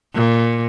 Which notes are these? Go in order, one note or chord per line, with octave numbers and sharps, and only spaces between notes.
A#2